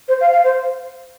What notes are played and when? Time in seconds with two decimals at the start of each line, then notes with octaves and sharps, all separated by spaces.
0.08 C5
0.21 F5
0.32 F5
0.44 C5